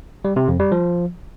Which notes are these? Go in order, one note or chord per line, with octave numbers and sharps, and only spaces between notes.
G3
C3
F2
G3
F3